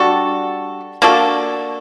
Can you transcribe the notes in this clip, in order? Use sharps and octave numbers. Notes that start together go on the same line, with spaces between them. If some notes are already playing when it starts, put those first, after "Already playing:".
Already playing: G3 D4 F#4 A4
A#3 D4 F#4 A4